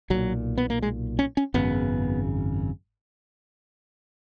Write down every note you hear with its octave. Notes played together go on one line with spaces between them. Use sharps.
B1 A#2 F#3
B3
A#3
G#3
C#4
C#4
G#1 F#2 C#3 B3